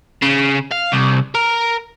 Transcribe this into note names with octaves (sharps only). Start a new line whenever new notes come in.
C#3
F5
C2
A#4